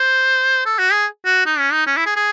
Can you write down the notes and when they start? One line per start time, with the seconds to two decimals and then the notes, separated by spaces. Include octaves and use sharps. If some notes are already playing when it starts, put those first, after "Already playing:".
Already playing: C5
0.66 A4
0.79 F#4
0.92 G#4
1.25 F#4
1.46 D#4
1.59 C#4
1.73 D#4
1.87 C#4
1.97 E4
2.06 G#4
2.16 G#4